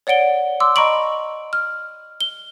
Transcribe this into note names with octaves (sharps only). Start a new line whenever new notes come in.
C#5 D5 F#5 D7 G7
C6 D6 E6
D#5 A#5 B5 C#6 D7 F#7
F6
G7